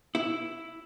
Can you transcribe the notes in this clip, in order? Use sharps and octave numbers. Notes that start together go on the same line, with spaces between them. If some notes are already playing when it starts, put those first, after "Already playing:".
E4